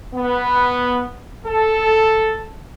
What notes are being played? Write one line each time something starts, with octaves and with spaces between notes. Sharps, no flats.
B3
A4